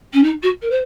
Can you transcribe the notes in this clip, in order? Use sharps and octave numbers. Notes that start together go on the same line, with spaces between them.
C#4
D#4
F#4
A#4
C5